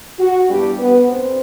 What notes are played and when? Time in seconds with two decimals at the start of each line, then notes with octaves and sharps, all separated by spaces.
0.19 F#4
0.49 G2 E3 G3 B3 D4 G4
0.79 B3 B4
1.08 B2 A3 C4 D4 C5